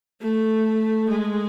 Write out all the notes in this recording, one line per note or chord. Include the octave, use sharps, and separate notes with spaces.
A3
G#3